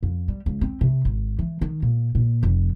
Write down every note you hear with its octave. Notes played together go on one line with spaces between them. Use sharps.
F2
G3
C#2
C4
C3
G#1
E3
D#3
A#2
A#2
F1